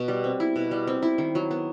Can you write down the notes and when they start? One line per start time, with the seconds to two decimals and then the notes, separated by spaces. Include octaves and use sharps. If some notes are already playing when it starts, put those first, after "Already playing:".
Already playing: B2
0.08 G3
0.24 C4
0.40 E4
0.56 B2
0.71 G3
0.87 C4
1.02 E4
1.18 D#3
1.35 F#3
1.51 B3